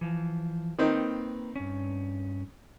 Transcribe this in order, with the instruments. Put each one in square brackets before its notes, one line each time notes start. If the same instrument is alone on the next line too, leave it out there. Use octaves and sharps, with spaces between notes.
[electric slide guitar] E3 F3
[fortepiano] D#3 C4 D#4 [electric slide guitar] A#3 B4
[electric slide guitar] G2 C#4